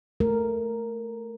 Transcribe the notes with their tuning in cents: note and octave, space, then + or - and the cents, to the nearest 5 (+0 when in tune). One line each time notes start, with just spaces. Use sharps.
A3 +0 A#4 -5